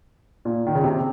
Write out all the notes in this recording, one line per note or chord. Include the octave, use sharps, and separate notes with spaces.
A#2
D#3
C#3
C3